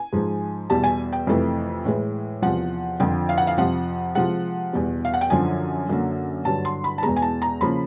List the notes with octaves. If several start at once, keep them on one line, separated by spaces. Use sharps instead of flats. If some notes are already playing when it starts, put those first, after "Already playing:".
Already playing: G#5
G#2 F3 G#3
E2 B2 G3 A5
G#5
G5
F2 C3 E3 A3
A2 E3 G#3
E2 C3 F3 F#5
F2 D3 F3 G5
F5
F#5
F5
F2 C3 F3 F#5
C3 F3 G#3 F#5
E2 B2 G3
F5
F#5
G5
F#2 D3 F3 G#5
F#2 D3 F#3 A#3
G2 D3 F#3 A5
C6
B5
A5
E2 B2 G#3 A#5
G#5
A5
A#5
C#3 F3 A#3 B5